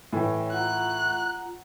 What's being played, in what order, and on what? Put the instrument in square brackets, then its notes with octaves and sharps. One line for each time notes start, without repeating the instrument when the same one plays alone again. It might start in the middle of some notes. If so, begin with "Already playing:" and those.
[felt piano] A2 E3 [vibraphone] C#5 G5
[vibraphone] F4 F#5 A#5 [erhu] F#6